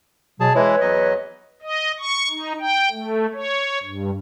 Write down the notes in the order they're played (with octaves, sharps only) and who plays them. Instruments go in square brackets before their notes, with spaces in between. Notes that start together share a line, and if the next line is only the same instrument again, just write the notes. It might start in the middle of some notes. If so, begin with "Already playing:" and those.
[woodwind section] B2 F#3 [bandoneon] G#4 A5
[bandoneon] E3 G#3 E4 [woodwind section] B4 C#5
[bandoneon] E2 F#3 D#5
[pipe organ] D#5
C#6
D#4
G5
A3
C#5
G2